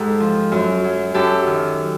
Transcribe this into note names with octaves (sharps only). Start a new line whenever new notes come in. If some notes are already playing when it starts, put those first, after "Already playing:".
Already playing: G#2 G4 A4
F3
F#2
F#3
F#2 G4 A4
D#3